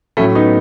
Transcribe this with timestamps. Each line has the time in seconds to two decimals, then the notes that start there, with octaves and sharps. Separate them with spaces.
0.17 A2 F#3 A3 C#4
0.35 B3 D#4